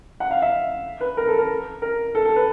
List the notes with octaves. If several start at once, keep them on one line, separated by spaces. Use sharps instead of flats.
F#5
F5
E5
B4
A#4
A4
A#4
A#4
A4
A4
B4